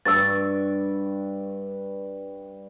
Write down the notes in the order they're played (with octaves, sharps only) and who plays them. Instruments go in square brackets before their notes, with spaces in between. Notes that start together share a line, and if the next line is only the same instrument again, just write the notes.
[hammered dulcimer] G2 C#6 D6 [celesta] E6 A6